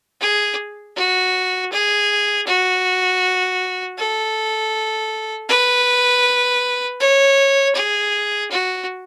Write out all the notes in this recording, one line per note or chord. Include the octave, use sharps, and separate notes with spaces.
G#4
F#4
G#4
F#4
A4
B4
C#5
G#4
F#4